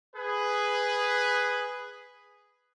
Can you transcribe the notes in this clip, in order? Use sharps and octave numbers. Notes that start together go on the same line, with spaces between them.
G#4 B4